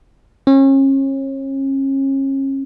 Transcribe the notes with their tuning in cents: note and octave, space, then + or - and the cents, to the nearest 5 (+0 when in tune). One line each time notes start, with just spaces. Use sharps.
C#4 -35